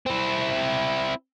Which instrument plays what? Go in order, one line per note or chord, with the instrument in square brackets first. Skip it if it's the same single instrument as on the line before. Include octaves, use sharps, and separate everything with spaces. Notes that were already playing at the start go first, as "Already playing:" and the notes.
[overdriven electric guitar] C4 E4